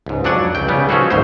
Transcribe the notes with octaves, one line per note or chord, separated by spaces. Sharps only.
C#2 G#2
F2 F#3 D4 D5 F#5 G#5
C#2 G5
C#3 G3 B3
F3 C#4 D#4 F#4 G#4 A4
G#1 D2 B2 F#3 D#4 C5